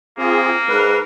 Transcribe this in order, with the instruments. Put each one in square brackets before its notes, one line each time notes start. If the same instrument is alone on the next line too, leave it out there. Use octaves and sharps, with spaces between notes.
[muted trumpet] A#3 [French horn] C4 [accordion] F4 G#4
[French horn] G#2 [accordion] A#4 B4